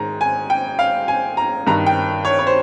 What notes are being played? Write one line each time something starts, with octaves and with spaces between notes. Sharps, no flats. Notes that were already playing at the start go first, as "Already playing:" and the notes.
Already playing: G#2 D#3 A#5
G#5
G5
F5
G#5
A#5
G2 D#3 A#5
G5
C#5
C#5
C5